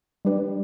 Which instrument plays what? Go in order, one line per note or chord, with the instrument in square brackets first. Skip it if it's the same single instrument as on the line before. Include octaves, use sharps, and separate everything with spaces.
[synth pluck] G3 D4 G4 B4 D5